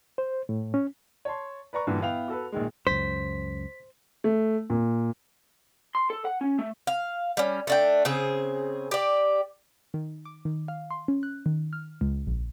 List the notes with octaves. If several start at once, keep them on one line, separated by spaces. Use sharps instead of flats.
C5
A2
C#4
C#5 A5 C6
B4 D5 A#5 C#6
G2 A#2 D3 E3
B3 E4 F5 G5 F7
F#4 A4 B4
A#1 D#3 G#3
C#2 F#2 C5 B6
A3
A#2
C6
A4
F#5
C#4
A3
F5
G3 C#4
A3 D4 G5
C#3 C4 G#4
G4 D5
D#3
D6
D#3
F5
C6
C#4
F#6
D#3
F6
C#2
A#1